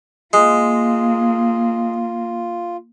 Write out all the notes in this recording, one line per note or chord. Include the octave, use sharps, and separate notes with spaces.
G#3 A#3 F4